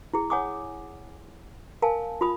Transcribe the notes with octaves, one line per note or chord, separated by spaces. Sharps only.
E4 G#4
C#5 F#5 G#5 D6 D#6
A#4 F5 G#5 A5
F4 B5 D#6